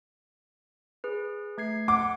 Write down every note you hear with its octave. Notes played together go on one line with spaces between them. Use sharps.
G#4 B4
A3 G#6 C7
F#5 D6